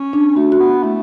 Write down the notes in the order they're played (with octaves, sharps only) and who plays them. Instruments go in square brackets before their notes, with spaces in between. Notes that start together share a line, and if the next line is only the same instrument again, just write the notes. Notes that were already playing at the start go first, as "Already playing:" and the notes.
Already playing: [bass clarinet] C#4
[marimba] D4
[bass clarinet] A3 [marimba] F#4
[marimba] F#4
[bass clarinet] B3
[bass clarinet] A3 [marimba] E4